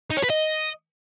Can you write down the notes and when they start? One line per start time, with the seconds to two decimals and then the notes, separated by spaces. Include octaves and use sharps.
0.10 D#4
0.17 C#5
0.23 B4
0.30 D#5